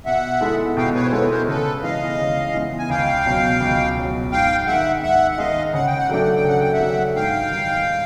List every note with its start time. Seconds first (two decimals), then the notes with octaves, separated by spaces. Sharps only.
0.05 B2 E5 F#5
0.41 G#3 B3 E4 A4
0.77 B2 F5 G5
0.94 B4 C#5
1.04 C5
1.12 G#3 B3 E4 A4 B4 C#5
1.24 B4
1.30 A#4 C5
1.47 C#3 A4 B4
1.83 E3 G#3 B3 D#5 F5
2.18 C#3
2.54 E3 G#3 B3
2.78 G#5
2.90 C#2 F5 G5
3.25 B2 F#3
3.61 C#2
3.96 B2 F#3
4.32 G#2 F5 G5
4.67 D#3 G#3 E5 F#5
5.02 G#2 E5 F#5
5.32 F#5
5.38 D#3 G#3 D#5 F5
5.74 C#3 F#5
5.86 G5
5.98 F#5
6.09 F#3 A3 D4 G5
6.23 F#5
6.35 G5
6.44 C#3 F#5
6.60 G5
6.72 E5 F#5
6.80 F#3 A3 D4
7.15 G#2 F5 G5
7.51 D#3 G3